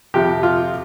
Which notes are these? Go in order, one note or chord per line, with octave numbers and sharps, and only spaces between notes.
F2 C3 F3 G4
F4